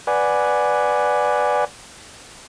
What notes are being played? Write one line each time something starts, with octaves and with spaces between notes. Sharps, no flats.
B4 D5 F#5 G#5